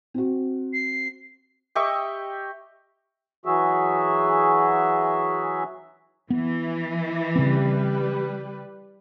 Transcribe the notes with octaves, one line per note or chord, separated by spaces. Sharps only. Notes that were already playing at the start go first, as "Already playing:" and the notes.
C4 F#4
C7
G4 D#5 E5 C#6
E3 F#3 F#4 G#4 E5
E3 B3
C#3 G3 C4 B4